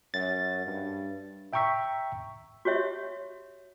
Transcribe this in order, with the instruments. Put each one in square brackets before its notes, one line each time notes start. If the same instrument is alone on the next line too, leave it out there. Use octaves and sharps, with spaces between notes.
[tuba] F#2 [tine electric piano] A6
[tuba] G2
[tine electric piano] E5 G5 A#5 C#6 E6 B6
[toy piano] F#4 G4 C#5 E5